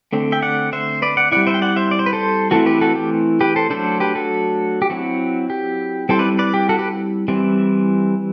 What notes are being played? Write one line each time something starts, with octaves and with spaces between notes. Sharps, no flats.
D3 A3 C4
E5 G5
D5 F#5
C5 E5
B4 D5
D5 F#5
G3 C4 E4 D5 F#5
C5 E5
G5
D5 F#5
C5 E5
D5
C5
B4
A4 C5
E3 A3 C4 E4 F#4 A4
G4 B4
F#4 A4
G4
G4 B4
A4 C5
F#3 A3 D4 A4 C5
G4 B4
F#4 A4
G4
F#3 C4 E4 F#4
G4
G3 C4 E4 A4 C5
B4 D5
B4 D5
G4
F#4 A4
G4 B4
E3 G3 C4 E4